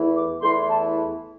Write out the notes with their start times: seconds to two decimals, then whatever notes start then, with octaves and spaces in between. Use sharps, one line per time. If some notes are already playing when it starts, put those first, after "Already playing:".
Already playing: E2 E3 A3 E4
0.15 D6
0.42 E2 E3 A3 E4 C6
0.68 A5